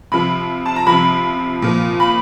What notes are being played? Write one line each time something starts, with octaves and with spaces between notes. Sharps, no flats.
C3 F3 B5
A5
A#5
C3 F3 B5
A#2 F3
B5